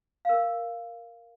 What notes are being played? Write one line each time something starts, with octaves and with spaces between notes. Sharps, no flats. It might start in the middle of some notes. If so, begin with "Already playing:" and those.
A#4 F5